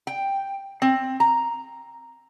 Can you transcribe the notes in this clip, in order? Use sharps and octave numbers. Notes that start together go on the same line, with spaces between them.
G5
C4
A#5